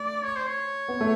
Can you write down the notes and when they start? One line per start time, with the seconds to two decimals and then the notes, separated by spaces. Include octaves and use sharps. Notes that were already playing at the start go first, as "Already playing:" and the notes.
Already playing: A3 D5
0.24 C#5
0.36 C5
0.47 C#5
0.88 B3
1.01 A3